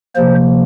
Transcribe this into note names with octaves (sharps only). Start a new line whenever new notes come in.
C3 F3 A#3 C5